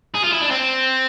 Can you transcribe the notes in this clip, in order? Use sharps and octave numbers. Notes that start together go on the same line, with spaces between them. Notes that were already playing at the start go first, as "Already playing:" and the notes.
G#4
F4
E4
D4
C4